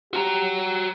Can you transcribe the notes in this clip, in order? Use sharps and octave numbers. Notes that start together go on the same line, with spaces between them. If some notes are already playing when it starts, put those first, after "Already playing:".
F#4 G4 A#5